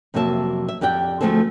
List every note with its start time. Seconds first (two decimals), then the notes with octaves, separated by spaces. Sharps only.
0.14 F2 C3 F#3 A#3 E5 A5
0.68 E5
0.81 F2 G4 D5 F#5 G5
1.21 D2 F3 A3 C4 G#4 A4